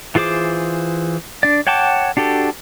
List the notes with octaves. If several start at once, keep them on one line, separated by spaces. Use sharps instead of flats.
E3 F4 G#4 C5 D6
D4 D5
C#5 F#5 G5 A5 D6
D4 F#4 G4 A4